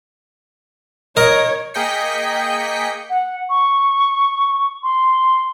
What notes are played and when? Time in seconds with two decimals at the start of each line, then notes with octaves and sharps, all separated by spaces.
1.17 A#4 C#5 D#5
1.74 A#3 G#4 D#5 G5 B6 C#7
3.10 F#5
3.50 C#6
4.83 C6